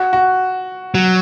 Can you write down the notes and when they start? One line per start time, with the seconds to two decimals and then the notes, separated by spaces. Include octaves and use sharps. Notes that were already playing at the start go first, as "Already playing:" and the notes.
Already playing: F#4
0.13 F#4
0.95 F#3